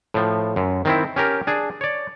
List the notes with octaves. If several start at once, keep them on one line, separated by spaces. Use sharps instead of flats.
A2 F3
F#2
D#3 C4 E4
C#4 G4 A#4
D4 G#4
C#5 D5